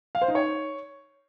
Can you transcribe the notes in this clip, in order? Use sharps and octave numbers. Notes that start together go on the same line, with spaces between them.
F5
C5
D#4
C#5